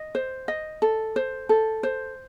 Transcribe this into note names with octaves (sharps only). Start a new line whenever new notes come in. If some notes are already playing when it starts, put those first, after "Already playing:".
Already playing: D#5
C5
D#5
A4
C5
A4
C5